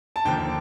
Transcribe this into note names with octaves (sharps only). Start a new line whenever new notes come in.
A5
D#2 D3 F3 A#3 G5